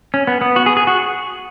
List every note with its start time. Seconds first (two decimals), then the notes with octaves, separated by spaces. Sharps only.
0.14 C#4
0.27 B3
0.41 B3
0.56 F#4
0.66 G#4
0.77 G#4
0.87 F#4